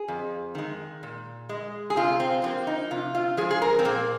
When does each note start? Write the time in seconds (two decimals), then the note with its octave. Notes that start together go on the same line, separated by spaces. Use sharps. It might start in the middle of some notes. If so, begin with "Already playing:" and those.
Already playing: G#4
0.08 F2
0.55 D#3 G#3
1.03 A#2
1.49 G#3
1.90 G#4
1.96 C3 F4
2.20 C4
2.43 F3 A#3 C4
2.67 D#4
2.91 C3 F4
3.15 F4
3.37 F3 G#3 G#4
3.51 G#4
3.62 A#4
3.79 C4
3.85 A#2 A#3